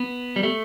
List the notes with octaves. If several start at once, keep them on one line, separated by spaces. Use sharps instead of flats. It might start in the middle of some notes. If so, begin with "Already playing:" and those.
Already playing: B3
G3
A3